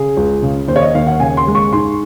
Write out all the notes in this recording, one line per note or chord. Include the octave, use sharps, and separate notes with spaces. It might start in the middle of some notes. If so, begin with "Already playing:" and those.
Already playing: C#3 G#4
C#2
C#3
D#2 C5
C#5
D#5
D#2 F5
F#5
C#3 G#5
C6
G#3
C#6
G#2 C6